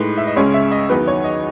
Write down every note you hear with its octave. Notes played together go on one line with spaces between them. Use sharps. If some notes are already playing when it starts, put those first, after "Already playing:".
Already playing: A2 G#3 D#4 B4
E5
D#5
C#2 C#3 G#3 C#4 C#5
E5
D#5
E2 D#3 F#3 B3 D#4 B4
C#5
D#5